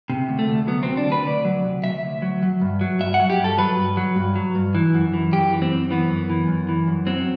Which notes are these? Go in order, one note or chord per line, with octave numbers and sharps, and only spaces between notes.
C3
D2
A3
D2
F#3 B3
C3 C4
D4
D2 B4
D2 D5
F#3
C3
D2 E5
D2
F#3
F#3
G2
F#3
G2 E5
F#5
F#3
G4
G2
A4
F#3 B4
G2
F#3
G2
F#3
G2
E3
F#2
E3
F#2 G4
E3
C4
F#2
E3 B3
F#2
E3
F#2
E3
F#2
F#3 C4